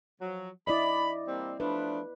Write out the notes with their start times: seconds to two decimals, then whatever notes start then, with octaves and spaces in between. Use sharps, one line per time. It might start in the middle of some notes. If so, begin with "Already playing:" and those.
0.21 F3 F#3
0.67 E4 D5 D#5 B5
1.28 G3 A#3 C4
1.60 F3 A3 D4 B4